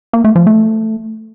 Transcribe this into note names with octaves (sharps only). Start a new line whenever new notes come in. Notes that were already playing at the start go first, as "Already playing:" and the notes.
A#3
A3
F3
A3